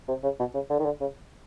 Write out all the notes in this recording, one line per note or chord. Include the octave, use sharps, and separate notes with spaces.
C3
C#3
B2
C#3
D3
D#3
D3
C#3